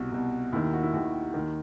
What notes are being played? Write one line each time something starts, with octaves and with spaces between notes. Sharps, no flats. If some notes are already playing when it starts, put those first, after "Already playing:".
Already playing: C2 B2 F#4
C2 B2
D#2 D#3 E4
E4
F#4
E4
D#2 D#3 F#4
D#2 D#3